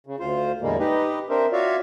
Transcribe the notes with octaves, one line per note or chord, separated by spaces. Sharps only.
C#3
D2 F4 C5
E2 A2 D3 G3 G#3 A#3
D#4 G4 B4 D#5
C4 D4 A#4 C5 E5
F4 F#4 C#5 D5 E5 F5